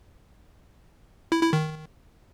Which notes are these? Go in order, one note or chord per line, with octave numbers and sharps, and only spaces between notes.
E4
E4
D#3